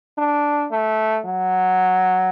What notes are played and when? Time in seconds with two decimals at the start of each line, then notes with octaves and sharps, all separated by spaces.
0.18 D4
0.71 A3
1.25 F#3